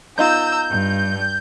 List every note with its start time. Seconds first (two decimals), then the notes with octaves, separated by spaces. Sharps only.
0.18 B3 D#4 F4 A#5 E6 G6
0.69 G2